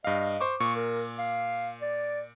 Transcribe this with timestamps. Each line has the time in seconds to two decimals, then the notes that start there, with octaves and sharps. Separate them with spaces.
0.04 G2 D#5 F5
0.41 C5 C#6 D6
0.60 A#2 C#6
0.75 A#4
1.18 F5
1.81 D5